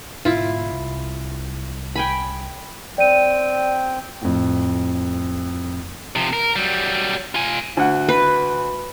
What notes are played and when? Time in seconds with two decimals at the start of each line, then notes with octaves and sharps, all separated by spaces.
0.25 G#2 B2 D3 E4 F4
0.71 C2
1.96 G5 G#5 B5
2.98 C4 D5 G5 D#7
4.22 F2 A2
6.16 C3 F3
6.33 A#4
6.56 F#3 G3
7.35 F4 G#5
7.77 D2 F#5
8.09 B4